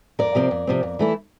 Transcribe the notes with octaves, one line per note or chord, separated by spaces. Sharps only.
F2 A#4 D5
C3 F3 C4
F2
C3 F3 C4
F2
E3 A3 E4